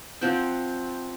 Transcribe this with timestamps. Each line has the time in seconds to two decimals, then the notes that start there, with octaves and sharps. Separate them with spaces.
0.21 F3 C4 F#5 G5